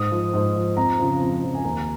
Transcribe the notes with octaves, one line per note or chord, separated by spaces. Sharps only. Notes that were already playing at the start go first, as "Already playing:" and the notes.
Already playing: G#2 D#6
F3
G#2
F3
F2 A#5
C#3 F3
F2
C#3 F3
G#5
D#2 A#5